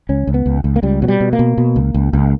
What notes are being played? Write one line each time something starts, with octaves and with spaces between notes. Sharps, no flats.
C#2 C#4
C#2
B3
C#2
C#2
A#3
C#2 G3
B2 F#3
G3
B2
A#3
B2
B2
C#2
C#2
C#2